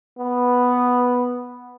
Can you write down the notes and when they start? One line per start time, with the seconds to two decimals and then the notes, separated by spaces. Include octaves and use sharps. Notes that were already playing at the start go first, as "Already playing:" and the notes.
0.18 B3